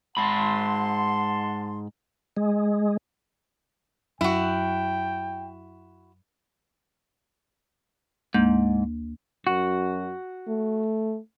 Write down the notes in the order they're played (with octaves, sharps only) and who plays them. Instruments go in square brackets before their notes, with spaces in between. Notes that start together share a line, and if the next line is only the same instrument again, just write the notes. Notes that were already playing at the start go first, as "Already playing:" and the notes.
[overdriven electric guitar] G#2 B5 [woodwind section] F#5 A5 C6
[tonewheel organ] G#3
[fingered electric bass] F#2 [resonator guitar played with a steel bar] E4 F#4 [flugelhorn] G5
[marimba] D2 A#3 G6 [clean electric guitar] G#2
[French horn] F#2 [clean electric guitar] F#4
[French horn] A3